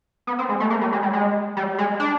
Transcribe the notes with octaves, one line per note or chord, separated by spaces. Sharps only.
B3
C4
G#3
A3
A#3
G3
G#3
G3
G#3
G3
G#3
D4